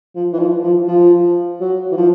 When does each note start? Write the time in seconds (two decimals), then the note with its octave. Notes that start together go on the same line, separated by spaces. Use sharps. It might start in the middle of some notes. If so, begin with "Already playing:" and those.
0.15 F3
0.33 E3
0.39 F3
0.64 F3
0.88 F3
1.61 F#3
1.91 E3
1.97 F3